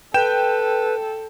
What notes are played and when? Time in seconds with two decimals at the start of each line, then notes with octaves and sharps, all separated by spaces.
0.14 A4 B4 G5 G6 E7